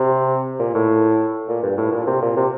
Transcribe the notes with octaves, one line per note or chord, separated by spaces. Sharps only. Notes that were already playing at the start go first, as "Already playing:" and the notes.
Already playing: C3
A#2
A2
A#2
G2
A2
A#2
C3
A#2
C3